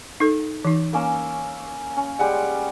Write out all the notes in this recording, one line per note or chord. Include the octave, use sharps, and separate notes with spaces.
D#4 A4
E3 D#4
A#3 C#4 E6
C#4
G3 G#3 F#5